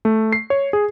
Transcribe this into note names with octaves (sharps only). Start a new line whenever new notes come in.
A3
C7
C#5
G#4